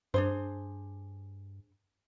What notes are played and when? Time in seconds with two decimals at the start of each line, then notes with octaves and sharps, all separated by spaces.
0.14 G2 D4 G#4 C5